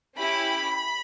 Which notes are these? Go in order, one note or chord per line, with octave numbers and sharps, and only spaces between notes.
C#4 E4 G4 B5